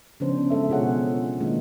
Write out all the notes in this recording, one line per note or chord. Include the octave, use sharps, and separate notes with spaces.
C#3 F3 B3 C#4 D4 C5
G#3 C4 A4 E5
B2 E3 F4 G#4 C#5 F#5
D#3 G#3 A#3 D4 E4 F4